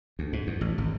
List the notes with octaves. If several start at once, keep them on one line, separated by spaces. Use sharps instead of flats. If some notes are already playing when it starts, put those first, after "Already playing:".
D2
G#2
E2
A1
G#1